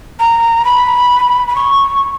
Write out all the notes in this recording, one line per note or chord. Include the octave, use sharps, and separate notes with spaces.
A#5
B5
B5
C#6